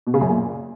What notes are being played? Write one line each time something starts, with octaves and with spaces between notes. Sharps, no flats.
B2
C#3
F#2
A#2